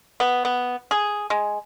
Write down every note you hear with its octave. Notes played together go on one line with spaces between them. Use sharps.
B3
B3
G#4
G#3